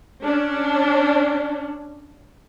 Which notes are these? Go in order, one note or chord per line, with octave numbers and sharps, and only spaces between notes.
C#4 D4